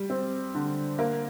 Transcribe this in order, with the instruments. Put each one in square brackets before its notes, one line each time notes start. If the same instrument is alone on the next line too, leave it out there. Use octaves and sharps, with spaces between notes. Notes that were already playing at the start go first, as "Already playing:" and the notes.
Already playing: [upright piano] G3
C4
D3
A#3